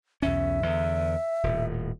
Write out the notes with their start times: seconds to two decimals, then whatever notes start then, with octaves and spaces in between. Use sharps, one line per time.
0.22 B1 E2 C#4 E5
0.63 E2 D3
1.43 D#1 A2